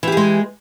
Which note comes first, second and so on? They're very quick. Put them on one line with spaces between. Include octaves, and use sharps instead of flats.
E3 G4 G#4 G#3